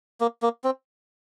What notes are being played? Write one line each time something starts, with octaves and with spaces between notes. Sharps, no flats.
A#3
A#3
C4